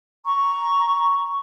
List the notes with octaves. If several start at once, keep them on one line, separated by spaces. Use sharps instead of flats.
A#5 C#6